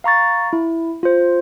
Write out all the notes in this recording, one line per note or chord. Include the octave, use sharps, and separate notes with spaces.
F5 A#5 C#6 A6
E4
F4 C5